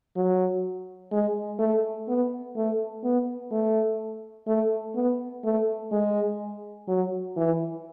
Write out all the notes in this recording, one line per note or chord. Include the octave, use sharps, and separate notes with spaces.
F#3
G#3
A3
B3
A3
B3
A3
A3
B3
A3
G#3
F#3
E3